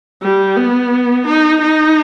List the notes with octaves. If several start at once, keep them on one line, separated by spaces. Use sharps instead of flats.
G3
B3
D#4
D#4